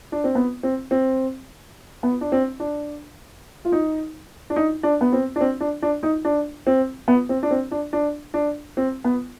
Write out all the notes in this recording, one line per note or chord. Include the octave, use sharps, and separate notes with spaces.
D4
C4
B3
C4
C4
B3
D4
C4
D4
F4
D#4
D4
D#4
D4
B3
C4
D4
C4
D4
D4
D#4
D4
C4
B3
C4
D4
C4
D4
D4
D4
C4
B3